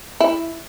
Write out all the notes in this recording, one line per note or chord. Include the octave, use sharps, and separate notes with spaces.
E4